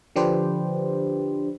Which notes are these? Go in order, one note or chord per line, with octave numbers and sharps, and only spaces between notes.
D3 F3 D4 G4 B4 C5